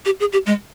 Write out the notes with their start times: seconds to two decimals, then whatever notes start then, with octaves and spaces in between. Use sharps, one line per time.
0.05 G4
0.20 G#4
0.33 G4
0.46 G#3